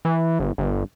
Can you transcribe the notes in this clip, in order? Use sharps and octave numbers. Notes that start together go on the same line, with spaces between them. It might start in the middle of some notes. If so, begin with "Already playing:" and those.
E3
G1
G1